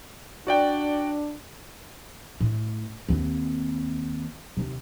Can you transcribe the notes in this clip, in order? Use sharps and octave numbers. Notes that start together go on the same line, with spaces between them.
D4 F#4 D5 G5
A2
D#2 C4
D#2 C3